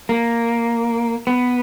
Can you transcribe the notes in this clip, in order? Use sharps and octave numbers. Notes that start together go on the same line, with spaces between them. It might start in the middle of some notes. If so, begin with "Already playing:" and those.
A#3
B3